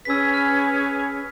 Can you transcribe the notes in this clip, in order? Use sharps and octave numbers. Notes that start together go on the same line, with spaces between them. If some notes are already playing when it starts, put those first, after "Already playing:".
C#4 G#4 B4 E6 B6
F6